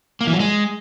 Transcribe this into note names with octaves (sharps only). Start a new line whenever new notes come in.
A#3
E3
F#3
G#3